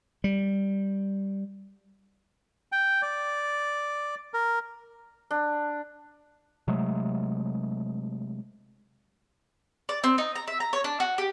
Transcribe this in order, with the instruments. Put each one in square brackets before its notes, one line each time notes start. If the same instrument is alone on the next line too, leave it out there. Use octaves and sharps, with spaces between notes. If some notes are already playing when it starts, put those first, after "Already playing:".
[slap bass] G3
[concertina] G5
D5
A#4
[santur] D4
[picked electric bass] C3 F#3 G#3 A3
[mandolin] D5
C4
D#4
A#5
E5
A#5
C#5
D4
F#4
G4